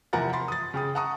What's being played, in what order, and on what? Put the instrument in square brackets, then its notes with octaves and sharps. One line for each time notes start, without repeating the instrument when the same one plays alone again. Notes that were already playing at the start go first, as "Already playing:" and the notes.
[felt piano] E2 C3 F3 A#4 F#5 A6
B5 C6 A6
D#6 A6
C#3 G5 D#6
F#5 A5 A#5 C#6 D#6